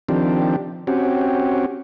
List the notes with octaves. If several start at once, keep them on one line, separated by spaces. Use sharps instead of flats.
D#3 F3 C4 D4 G4
C4 C#4 F#4 G4